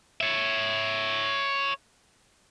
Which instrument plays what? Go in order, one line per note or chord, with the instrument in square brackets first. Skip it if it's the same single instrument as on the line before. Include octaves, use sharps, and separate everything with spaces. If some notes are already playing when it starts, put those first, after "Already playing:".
[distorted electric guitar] C#5 E5